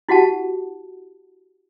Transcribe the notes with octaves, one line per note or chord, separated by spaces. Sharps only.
E4 F#4 G4 F#5 A5